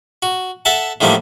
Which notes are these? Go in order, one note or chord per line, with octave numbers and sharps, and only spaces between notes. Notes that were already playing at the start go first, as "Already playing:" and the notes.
F#4
A4 E5 F#5 A5
A2 D3 D#3 F3 G3 A#3